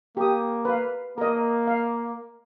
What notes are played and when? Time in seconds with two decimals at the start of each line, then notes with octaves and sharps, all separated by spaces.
0.17 A#3 G4 D#6
0.65 B4 F5
1.18 A#3 A#4 D#5
1.67 F5